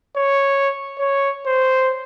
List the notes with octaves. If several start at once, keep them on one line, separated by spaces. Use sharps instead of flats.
C#5
C#5
C5